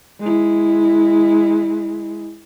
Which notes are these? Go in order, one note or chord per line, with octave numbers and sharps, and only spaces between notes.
G#3 E4